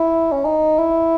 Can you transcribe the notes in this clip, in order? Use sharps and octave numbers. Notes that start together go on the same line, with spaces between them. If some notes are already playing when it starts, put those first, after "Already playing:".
Already playing: E4
C#4
D#4
E4